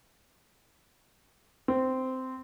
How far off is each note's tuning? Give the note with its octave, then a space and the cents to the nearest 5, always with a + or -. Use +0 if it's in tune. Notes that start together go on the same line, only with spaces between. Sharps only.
C4 -10